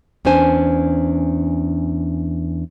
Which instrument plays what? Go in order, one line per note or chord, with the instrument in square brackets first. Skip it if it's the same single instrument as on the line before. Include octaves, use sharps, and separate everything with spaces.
[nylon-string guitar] E2 C#4 D4 C5 G#5